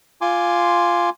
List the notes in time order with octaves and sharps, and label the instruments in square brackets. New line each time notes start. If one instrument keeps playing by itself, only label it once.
[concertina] F4 G#5 C6 D6